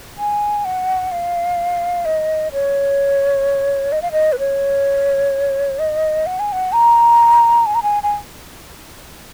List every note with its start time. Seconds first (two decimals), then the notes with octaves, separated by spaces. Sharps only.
0.18 G#5
0.65 F#5
1.12 F5
2.05 D#5
2.52 C#5
3.92 D#5
4.02 F5
4.12 D#5
4.32 B4
4.39 C#5
5.79 D#5
6.26 F#5
6.39 G#5
6.53 F#5
6.72 A#5
7.66 G#5
7.75 A#5
7.83 G#5
8.03 G#5